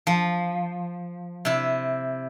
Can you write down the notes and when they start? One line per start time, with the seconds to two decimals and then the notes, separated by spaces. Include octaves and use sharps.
0.07 F3
1.45 C3 E4